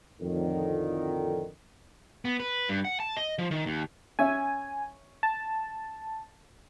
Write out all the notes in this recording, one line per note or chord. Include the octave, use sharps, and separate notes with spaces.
F2 A2 D3 D#3
B3
B4
G2
F#5
A5
D#5
F3
D#3
D#2
C#4 E5 G#5
A5